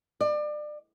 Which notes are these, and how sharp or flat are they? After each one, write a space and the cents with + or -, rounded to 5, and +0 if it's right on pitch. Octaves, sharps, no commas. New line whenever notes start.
D5 +30